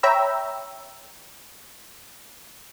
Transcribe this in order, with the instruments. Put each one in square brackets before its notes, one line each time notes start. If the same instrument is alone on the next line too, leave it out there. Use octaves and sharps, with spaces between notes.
[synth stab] C#5 E5 G5 A#5 B5 E6